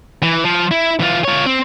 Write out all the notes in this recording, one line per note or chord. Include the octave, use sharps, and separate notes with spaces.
E3
F3
E4
E3 F4
F4 C#5
C4